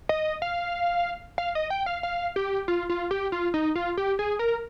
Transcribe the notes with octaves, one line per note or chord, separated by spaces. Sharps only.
D#5
F5
F5
D#5
G5
F5
F5
G4
F4
F4
G4
F4
D#4
F4
G4
G#4
A#4